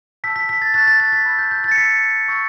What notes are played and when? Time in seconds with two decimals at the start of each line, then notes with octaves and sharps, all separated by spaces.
0.24 A5 E6 G6 B6
0.36 B6
0.49 B6
0.62 A6
0.74 A5 C#6 F#6 A6
0.87 A6
1.00 A6
1.12 B6
1.26 B5 E6 G6
1.39 G6
1.51 G6
1.64 A6
1.71 C#7
1.77 B5 E6 G6 B6
2.28 C#6 E6 G6